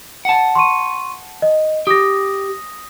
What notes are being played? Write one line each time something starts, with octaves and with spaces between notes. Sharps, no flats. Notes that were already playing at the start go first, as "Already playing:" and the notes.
F#5 A5
C6 C#6 D#7
D#5
G4 D#6 A#6